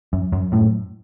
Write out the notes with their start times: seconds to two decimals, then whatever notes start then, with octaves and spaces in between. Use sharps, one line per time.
0.13 F#2
0.32 F#2
0.52 F#2 A2